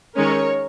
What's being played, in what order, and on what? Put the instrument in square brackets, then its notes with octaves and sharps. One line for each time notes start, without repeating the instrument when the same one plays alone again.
[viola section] D#3 G#3 C#4 A#4 C#5